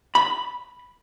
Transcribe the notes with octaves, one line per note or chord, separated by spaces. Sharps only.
B5